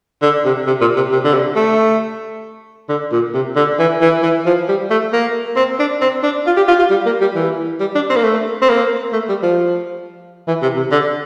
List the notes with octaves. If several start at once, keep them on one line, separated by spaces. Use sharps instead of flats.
D3
C3
C3
A#2
C3
C3
D3
C3
A3
D3
A#2
C3
D3
E3
E3
E3
F3
G3
A3
A#3
C4
D4
C4
D4
F4
G4
F4
F4
G3
A#3
G3
E3
G3
D4
C4
A#3
A3
C4
A#3
A3
G3
F3
E3
C3
C3
D3